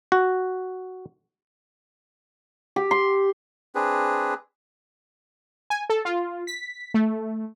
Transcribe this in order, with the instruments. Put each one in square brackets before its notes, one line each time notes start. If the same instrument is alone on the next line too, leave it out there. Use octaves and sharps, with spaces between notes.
[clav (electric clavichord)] F#4
[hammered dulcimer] G4
C6
[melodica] C4 D4 G#4 B4
[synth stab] G#5
A4
F4
B6
A3